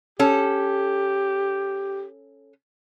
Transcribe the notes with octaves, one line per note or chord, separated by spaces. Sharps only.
C#4 G4 A4